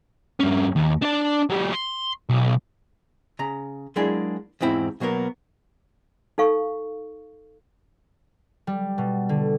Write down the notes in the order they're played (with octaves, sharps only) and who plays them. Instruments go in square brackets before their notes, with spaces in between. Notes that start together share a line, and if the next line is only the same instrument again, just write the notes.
[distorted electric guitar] G2 C#4
D#2
D4 D5
F#3 G4
C6
B1
[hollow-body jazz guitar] C#3 A#5
F#3 G#3 A#3 D4 E4 G#4
E2 G#2 C4 E4
B2 F#3 A#3 B3 A#4
[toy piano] D#4 A4 F5 C#6
[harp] G3
B2
D3